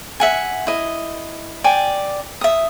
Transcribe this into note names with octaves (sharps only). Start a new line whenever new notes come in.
E5 F#5 G#5
E4 D#5
D5 G5 G#5
E5 D#6